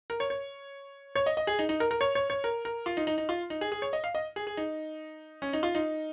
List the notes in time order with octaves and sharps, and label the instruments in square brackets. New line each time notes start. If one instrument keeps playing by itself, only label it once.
[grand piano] A#4
C#5
C#5
C#5
D#5
D#5
G#4
D#4
D#4
A#4
A#4
C#5
C#5
C#5
A#4
A#4
F4
D#4
D#4
D#4
F4
D#4
G#4
G#4
C#5
D#5
F5
D#5
G#4
G#4
D#4
C#4
D#4
F4
D#4